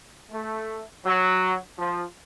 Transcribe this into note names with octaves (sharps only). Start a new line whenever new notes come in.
A3
F#3
F3